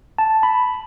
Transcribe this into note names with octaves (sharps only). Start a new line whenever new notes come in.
A5
B5